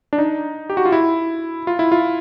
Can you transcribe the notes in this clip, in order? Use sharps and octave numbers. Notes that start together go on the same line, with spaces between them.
D4
D#4
G4
F#4
F4
E4
F4
E4
F4